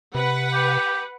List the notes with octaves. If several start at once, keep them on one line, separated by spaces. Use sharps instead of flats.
C3 B4 F#5
G4